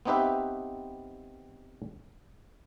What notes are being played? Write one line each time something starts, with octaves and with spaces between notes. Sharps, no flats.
B3 C4 D#4 G4 B4 E5